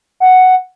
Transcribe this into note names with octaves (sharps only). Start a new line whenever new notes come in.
F#5